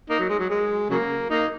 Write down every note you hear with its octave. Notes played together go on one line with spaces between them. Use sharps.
A#3 D#4
F#3
G#3
F#3
G#3
C#3 F#3 A#3
A#3 D#4